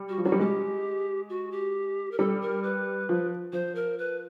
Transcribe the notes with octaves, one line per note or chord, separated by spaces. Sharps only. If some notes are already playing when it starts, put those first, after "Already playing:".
Already playing: G3
F#4
F3
F#3 F#4
G3
G#3 G4
F#4
G4
A#4
G3 A4
A#4
B4
F3
F3 C5
A#4
B4